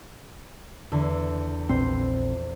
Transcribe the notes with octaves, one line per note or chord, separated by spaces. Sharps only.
E2 D3
A#1 A#2 C4 C5